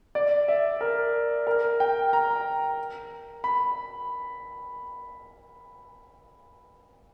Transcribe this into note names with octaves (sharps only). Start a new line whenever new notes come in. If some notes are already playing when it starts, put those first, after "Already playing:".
D5
E5
A#4
A#4
G5
A#5
B5